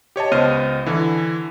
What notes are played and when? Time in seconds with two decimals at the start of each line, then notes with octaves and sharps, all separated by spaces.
0.16 G4 C#5 D#5 A5
0.31 C#2 B3 C5 D#5 F6 D#7
0.86 D3 E3